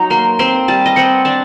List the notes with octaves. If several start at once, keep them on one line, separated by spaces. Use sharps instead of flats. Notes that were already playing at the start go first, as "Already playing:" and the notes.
Already playing: F#3 D#4 A#5
A#3 C6
C4 C6
G3 A5
D#5
C4 F#5
D4 A5